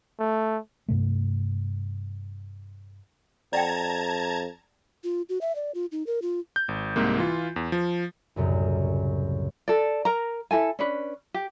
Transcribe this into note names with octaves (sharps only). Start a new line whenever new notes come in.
A3
G2 C3 A3
F2 D5 F#5 G5 A5 A#5 G#6
F4
F#4
E5
D5
F4
D#4
A#4
F4
G6
G#1
C2 G#2 C3 A#3
E3 F4
E2
F3
C2 F#2 A2 C#3
A4 D5
A#4 A#5
E4 A4 G#5
C#4 D4 B4
G4